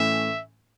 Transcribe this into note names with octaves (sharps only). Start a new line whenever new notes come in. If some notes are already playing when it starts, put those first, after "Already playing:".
Already playing: A2 E3 A3 C#4 E5